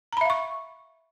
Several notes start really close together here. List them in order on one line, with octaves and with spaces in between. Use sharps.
A#5 B5 E5 F5 C#6